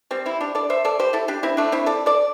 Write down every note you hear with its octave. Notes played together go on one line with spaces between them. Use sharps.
G3 C4
C4 E4
D4 G4
A4 D5
C5 E5
A4 D5
G4 C5
E4 A4
D4 G4
C4 E4
A3 D4
C4 E4
A4 D5
A4 D5